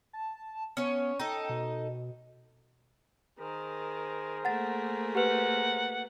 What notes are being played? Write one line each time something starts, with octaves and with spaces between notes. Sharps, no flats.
A5
B3 C#4 C#5
D#4 A4 G5
B2
D#3 G#4 A#4 C5
A3 A#3 F#5 A6
G4 B4 F#5